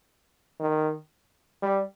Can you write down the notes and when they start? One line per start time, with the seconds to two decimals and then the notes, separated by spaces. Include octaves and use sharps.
0.60 D#3
1.62 G3